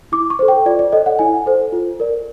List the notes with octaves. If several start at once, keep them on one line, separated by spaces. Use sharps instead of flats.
E4 D6
C#6
A4 C5
G5
F4 D5
D5
A4 C#5 D#5
F#5
E4 G#5
A4 C5
F4
A#4 D5